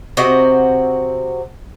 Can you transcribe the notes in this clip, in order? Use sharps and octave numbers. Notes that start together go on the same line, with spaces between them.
C3 C4 F#4 D#5